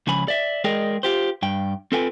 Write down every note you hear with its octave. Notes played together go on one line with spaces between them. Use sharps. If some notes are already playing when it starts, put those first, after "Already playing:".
C#2 C#3 F3 G#5 B5
D5 E5
G#3 G#4 A#4 D5 D#5 G5
F4 G4 C5
G2 G5
C4 F4 A4 B4 G5 G#5